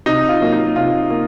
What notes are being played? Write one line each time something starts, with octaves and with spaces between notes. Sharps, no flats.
C3 D#4
F4
F#3 A#3
D#4
C3 F4
A#3